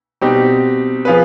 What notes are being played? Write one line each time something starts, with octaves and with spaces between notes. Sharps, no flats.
B2 G3 C4 D#4 G4
F3 B3 F4 G#4 B4